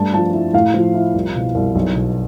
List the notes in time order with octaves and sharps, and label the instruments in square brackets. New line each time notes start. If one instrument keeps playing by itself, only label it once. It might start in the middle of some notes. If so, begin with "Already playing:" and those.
Already playing: [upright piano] G2 A3 A5
F3 A5
E4
A2 F5
F3
E4
C2
B2
C2
B1
B2